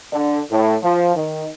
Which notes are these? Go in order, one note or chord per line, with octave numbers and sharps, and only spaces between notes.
D3
A2
F3
D#3